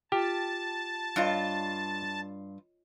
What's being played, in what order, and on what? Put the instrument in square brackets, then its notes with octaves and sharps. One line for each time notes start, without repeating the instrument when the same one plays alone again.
[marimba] F4 G5 [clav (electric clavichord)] G4 [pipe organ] A5
[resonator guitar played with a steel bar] G2 F4 [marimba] C#5 D#5